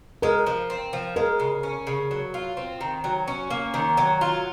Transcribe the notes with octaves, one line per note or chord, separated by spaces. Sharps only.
G#3 A#4
F3
C4
F3
G#3 A#4
C#3
C#4
C#3
F#3
F4
C4
D#3
F#3
C#4
A#3
D#3
F#3
F4